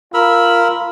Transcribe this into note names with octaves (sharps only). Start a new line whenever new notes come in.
F4 A#4 B5 E6